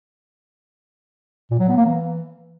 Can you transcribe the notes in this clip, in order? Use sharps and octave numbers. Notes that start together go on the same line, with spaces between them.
A#2
F#3
B3
A#3
E3